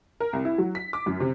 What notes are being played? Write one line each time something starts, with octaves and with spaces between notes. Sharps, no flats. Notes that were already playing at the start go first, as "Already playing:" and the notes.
A#4
C2
E4
F#3
B6
D6
F#2
C3